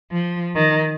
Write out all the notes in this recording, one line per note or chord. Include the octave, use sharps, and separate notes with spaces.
F3
D#3